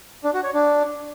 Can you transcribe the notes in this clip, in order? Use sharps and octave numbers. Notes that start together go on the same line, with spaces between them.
D4
F#4
C#5
D4